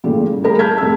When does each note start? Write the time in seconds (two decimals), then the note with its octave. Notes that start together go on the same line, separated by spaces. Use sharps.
0.04 A#2 C#3 E3 G3 A3
0.31 G1
0.43 A3 G4 G#4 A#4 B5
0.59 A5 F6 G6 G#6 B6
0.78 F1 G#3 C4 A5 E6